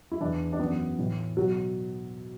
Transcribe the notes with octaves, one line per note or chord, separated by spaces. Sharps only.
E4
E2 E3 D4
D4
F#2 E3 B3
A2 E3
B2 F#3